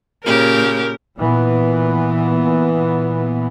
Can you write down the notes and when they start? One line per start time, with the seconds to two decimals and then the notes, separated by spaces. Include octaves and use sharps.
0.25 A#2 C#3 G4 A#4
1.16 A#2 E3 B3